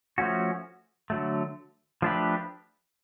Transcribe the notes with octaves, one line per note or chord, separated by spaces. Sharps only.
F3 A3 C#4 F#4
D3 F#3 A3
F3 A3 D4 G4 B4